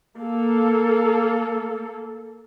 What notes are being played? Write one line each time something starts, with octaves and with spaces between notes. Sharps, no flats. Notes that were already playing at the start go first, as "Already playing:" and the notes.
A#3 A4